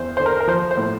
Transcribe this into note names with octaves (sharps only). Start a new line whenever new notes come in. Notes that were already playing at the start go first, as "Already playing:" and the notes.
Already playing: E2 C5
D3 C5
A#4
A#4
F3 C5
C5
A2